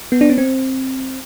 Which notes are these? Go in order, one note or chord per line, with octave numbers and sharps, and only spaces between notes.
B3
D4
C#4
C4